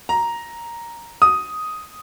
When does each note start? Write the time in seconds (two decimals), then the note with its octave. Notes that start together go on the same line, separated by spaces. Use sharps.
0.09 A#5
1.22 D#6